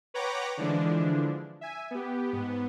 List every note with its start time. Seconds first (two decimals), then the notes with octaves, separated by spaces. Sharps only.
0.14 B4 C#5 F#5 G5 A#5 D6
0.57 D3 E3 F3 G#3 D4
1.61 E5 G#5
1.91 B3 G4
2.33 G#2 B3